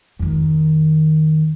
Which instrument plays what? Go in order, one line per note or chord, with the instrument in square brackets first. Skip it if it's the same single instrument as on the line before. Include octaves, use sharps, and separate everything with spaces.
[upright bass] F2 D#3